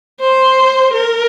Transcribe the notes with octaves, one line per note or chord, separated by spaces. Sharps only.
C5
A#4